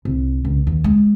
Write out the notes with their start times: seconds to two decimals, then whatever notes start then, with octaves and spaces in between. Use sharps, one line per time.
0.05 C2
0.45 C#2
0.67 D#2
0.84 G#3